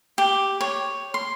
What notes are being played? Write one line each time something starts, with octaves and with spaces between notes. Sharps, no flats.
G4
C#5
C6